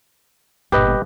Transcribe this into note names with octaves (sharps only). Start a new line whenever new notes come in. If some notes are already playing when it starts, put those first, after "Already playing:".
G1 A#2 G4 B4 D#5